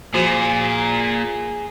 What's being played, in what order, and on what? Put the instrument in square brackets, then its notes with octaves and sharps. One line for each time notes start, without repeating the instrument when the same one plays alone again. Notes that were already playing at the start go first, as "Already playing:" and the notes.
[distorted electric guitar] A#2 [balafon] F3 F#4 C5 [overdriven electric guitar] G#4